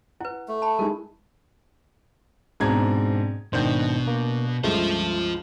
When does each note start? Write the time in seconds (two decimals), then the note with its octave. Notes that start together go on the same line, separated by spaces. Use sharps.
0.20 E4 B4 F#5
0.48 A3
0.62 A5 B5
0.79 G#3 D#4 E4 A#4
2.60 G#2 B2 C4 D4 A#5 G#6
3.53 G#1 B2 D#3 D4 C5 G6
4.07 A#3
4.64 C#2 G2 A3 F4 C5